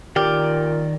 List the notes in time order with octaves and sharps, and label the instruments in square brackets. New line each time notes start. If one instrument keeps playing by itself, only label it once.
[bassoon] A#2 [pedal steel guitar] D#3 D5 F6 [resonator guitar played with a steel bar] G4